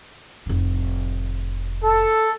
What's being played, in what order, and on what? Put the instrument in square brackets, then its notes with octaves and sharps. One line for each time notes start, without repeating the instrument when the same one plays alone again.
[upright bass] F1 A2
[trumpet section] A4